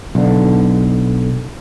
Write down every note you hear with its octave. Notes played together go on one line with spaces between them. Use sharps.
B1 D3